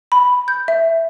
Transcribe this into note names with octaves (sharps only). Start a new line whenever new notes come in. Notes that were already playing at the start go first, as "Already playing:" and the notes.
B5
G6
E5